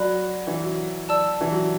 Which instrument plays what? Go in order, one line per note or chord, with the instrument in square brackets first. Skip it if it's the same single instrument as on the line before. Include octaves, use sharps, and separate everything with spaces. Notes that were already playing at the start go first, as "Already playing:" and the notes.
Already playing: [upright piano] F#3 [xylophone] D5 B5 F#6
[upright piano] E3
F#3
[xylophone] D5 A5 E6
[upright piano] E3
F#3